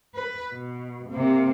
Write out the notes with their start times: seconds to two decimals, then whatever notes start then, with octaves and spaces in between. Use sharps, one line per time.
0.15 B4
0.53 B2
1.10 C3 A#3